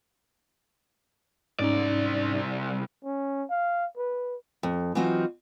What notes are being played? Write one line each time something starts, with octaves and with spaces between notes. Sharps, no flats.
C2 G#2 C#4 D#4 D5
C#4
F5
B4
F2
E3 F#3 C4 D#4 F4 F#4